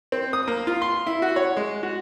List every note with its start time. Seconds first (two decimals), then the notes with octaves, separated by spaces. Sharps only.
0.12 C4
0.33 D#6
0.48 A#3
0.67 F4
0.82 C6
1.07 E4
1.22 F#4
1.36 C#5
1.57 G#3
1.83 F#4